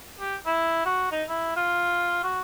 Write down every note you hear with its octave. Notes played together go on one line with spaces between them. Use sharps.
G4
E4
F#4
D#4
E4
F4
F#4